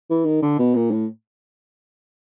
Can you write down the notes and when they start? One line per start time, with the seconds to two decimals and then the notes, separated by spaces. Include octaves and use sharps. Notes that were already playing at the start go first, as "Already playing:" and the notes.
0.10 E3
0.26 D#3
0.42 D3
0.59 B2
0.75 A#2
0.91 A2